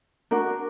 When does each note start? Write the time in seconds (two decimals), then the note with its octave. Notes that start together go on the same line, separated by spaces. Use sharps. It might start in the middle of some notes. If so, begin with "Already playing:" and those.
0.31 D4 F#4 A#4